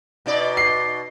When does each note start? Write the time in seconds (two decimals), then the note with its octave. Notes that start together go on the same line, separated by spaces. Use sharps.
0.26 B2 D#4 D5
0.57 C7